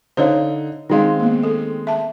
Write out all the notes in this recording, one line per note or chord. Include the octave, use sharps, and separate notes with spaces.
D3 D#4 C5 C#5 F5
D#3 G#3 C4 D#4 F5
A#3 B3
A4
E5 A5